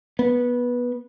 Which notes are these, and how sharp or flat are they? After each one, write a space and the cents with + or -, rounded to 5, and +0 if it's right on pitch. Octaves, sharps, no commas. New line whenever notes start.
B3 -15